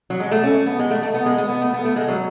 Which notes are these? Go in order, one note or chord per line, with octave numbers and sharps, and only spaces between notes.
F#3
G#3
A3
C#4
B3
G#3
A3
A3
B3
G#3
B3
B3
A3
B3
A3
G#3
F#3